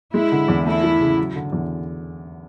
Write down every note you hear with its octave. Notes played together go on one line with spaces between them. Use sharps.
G#3 E4
D3
E2
A3 E4
E3
C#3
F#3
D3
E2